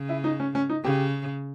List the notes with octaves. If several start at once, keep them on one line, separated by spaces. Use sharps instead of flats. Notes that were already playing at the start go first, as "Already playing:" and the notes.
Already playing: C#3
E4
D#4
C#4
C#4
D#4
C#3 G4